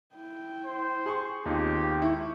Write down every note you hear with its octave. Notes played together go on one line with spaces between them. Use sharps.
E4 G5
C5
G#4 C6 C#6
D#2 B3 C4 D#4 F4 G4
G#3 E4 C#6